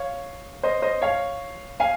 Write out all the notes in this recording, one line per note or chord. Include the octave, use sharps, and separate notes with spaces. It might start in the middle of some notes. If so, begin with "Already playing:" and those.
Already playing: C#5 F5
C5 D#5
C5 D#5
C#5 F5
F5 G#5